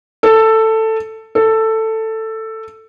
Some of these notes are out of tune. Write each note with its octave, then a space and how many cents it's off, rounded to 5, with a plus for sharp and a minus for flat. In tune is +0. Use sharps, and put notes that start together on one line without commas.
A4 +10
A4 +10